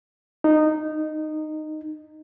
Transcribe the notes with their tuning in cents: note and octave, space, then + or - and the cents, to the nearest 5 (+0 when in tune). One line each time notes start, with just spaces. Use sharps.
D#4 -15